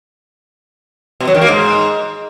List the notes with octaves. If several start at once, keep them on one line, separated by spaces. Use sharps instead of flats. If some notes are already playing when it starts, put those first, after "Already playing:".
B2
F#3
D#3
A#3
G#2